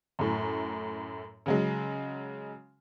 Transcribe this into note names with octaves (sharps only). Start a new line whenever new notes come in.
F#2 A2
C#3 F#3 G#3